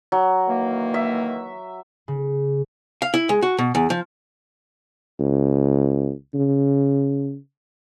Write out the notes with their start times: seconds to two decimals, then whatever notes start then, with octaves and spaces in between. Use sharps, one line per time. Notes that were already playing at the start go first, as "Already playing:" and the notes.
0.12 F#3
0.48 D#3 E3 A#3
0.94 E5
2.08 C#3
3.02 F5
3.14 E4
3.29 G#3
3.42 F#4
3.58 B2
3.75 E2
3.90 F3
5.20 C#2
6.34 C#3